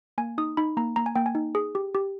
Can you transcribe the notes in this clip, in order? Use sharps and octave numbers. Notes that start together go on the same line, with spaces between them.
A#3 G#5
D#4 D#6
D#4 B5
A#3 A#5
A#3 A#5
G#5
A#3 G5
G#5
D#4
G#4
G4
G4